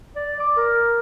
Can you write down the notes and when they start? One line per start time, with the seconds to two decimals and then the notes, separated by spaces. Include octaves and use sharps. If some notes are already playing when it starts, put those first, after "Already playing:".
0.16 D5
0.40 D6
0.57 A#4